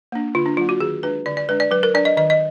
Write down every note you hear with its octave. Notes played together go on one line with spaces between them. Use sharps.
A#3 D4
D3 F4
D4
F#3 A#3 F4
F#4
D#3 G#4
G#3 D4 B4
D3 D5
D5
G#3 D4 B4
D5
F#3 B4
A#4
D4 D5
D#5
D#3 D#5
D#5